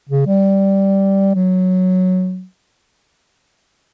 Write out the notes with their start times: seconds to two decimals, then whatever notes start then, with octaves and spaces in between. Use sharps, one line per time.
0.09 C#3
0.27 G3
1.35 F#3